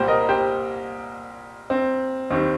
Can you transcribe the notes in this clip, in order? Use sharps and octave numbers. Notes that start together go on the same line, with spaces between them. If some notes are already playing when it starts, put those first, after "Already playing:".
Already playing: C2 A#2 G3 G4 C5
A#4 D#5
G4 C5
C4
D#2 D#3 G3 C4